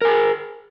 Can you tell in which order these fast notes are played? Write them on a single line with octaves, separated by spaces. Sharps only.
A#4 G#5 G#4